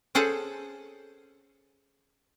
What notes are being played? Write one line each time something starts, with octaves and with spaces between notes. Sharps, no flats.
C#4 G#4 A4 C5 F#5